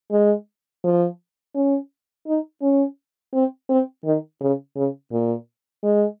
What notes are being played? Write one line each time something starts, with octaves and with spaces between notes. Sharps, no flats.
G#3
F3
C#4
D#4
C#4
C4
C4
D#3
C#3
C#3
A#2
G#3